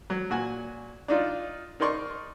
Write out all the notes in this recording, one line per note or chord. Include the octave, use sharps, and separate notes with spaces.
F#3
A#2 F#4 G#5
D4 D#4 F4
D#4 A#4 D5 C6 C#6